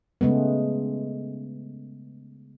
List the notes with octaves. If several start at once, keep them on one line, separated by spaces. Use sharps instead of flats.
C#3 G#3 A3 B3